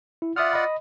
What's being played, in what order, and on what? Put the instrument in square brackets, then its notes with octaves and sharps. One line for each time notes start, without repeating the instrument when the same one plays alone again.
[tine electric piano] E4
[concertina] F4 D5 F#5 [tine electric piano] E5 D#6 F6
[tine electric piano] D#5 B5